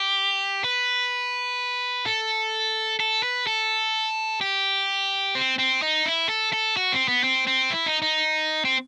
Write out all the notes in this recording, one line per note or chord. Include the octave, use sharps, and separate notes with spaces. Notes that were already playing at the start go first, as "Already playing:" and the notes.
Already playing: G4
B4
A4
A4
B4
A4
G4
C4
C4
D#4
E4
A4
A4
F#4
C4
B3
C4
C4
E4
D#4
D#4
C4